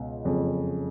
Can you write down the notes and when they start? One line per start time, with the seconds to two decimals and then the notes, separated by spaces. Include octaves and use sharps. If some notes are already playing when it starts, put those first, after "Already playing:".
Already playing: C#2 B2
0.25 F#1 F2 C#3 G#3 C#4